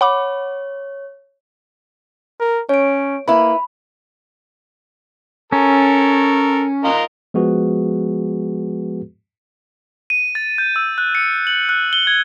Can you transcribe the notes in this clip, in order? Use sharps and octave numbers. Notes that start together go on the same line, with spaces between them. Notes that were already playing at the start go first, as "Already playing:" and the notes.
C#5 F#5 B5 D6
A#4
C#4 C#5 D7
A#3 E4 B4 B5
C#4 A4 A#4
F4 A#4 D#5
F3 G#3 B3 F#4 G#4 B4
D#7
A6
G6
E6
F#6
C#7
F#7
F#6
G7
G#6